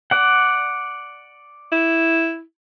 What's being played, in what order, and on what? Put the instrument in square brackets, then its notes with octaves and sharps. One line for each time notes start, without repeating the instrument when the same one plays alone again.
[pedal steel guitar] D5 F#5
[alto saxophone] E4